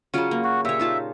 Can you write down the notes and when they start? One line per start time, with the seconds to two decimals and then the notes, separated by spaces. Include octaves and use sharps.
0.14 C#3 F#3 C#4 F4 D5
0.31 A#3
0.44 F#4
0.65 A#2 G4 C#5 E5
0.79 D#4 F4 A5